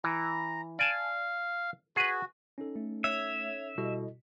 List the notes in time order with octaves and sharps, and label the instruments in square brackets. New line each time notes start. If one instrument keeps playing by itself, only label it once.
[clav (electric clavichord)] E3 [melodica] A#5
[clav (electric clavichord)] D5 G#5 A5 [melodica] F5
[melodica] F#4 [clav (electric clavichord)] G#4 B4
[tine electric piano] C#4 D#4 A4
[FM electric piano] A3
[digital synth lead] C#5 [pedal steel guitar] E5
[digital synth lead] B2 [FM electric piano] G3 [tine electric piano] E4 A4 D#5